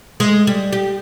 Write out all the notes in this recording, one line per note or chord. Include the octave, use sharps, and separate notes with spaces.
G#3
G3
G4